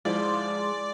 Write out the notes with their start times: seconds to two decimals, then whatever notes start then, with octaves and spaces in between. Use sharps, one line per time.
0.05 G#2 F3 G#3 E4 F4 D5